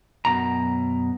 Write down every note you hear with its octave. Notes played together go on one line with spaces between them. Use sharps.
F#2 B2 A#5